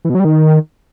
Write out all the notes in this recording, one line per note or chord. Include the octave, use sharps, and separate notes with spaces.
E3
B2
F#3
G3
D#3